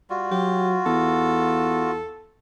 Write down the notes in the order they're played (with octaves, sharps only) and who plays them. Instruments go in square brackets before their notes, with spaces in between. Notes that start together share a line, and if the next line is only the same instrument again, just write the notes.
[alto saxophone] G3 [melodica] F4 F#4
[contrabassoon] F#3 [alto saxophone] G4
[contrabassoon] E2 [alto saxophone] A4